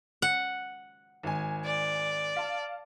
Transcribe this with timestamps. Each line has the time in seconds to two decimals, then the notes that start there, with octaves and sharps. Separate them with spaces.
0.22 F#5
1.23 G#1 G#5
1.65 D5
2.36 F5 A5